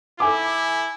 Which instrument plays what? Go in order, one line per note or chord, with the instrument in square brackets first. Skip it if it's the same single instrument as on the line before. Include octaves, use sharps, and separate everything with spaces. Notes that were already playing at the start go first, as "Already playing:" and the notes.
[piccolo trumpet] E4 [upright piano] A4 G#5 D6